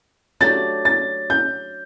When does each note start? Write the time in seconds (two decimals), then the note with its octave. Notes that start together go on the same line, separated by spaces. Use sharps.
0.41 F#3 A3 D4 G4 A6
0.85 A6
1.30 G6